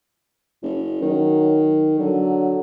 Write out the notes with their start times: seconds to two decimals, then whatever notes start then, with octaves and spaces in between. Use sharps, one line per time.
0.62 F#1
1.02 D#3 F#3
1.99 D3 F#3